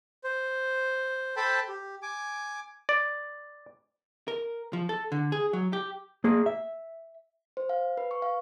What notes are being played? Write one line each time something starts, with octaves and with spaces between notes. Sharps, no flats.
C5
A4 C5 G5 A5 B5
G4
G#5 D6
D5
A#4
F3
A4
D3
G#4
F#3
G4
A#3 G#4
E5
C5
F5
B4
C#6
F5